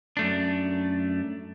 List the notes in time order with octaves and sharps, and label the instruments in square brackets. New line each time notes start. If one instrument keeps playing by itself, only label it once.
[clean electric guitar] F#2 A3 D4